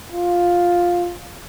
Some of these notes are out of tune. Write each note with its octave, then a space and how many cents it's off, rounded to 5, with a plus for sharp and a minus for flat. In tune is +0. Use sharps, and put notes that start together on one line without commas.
F4 +5